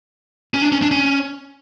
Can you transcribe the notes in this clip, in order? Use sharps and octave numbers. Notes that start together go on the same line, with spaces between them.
C#4
D4
C#4
D4
C#4